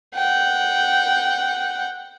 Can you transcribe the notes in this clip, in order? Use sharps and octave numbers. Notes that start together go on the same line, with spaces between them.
F#5 G5